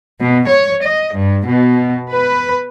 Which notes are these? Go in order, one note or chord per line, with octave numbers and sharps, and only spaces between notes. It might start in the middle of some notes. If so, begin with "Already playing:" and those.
B2
C#5
D#5
G2
B2
B4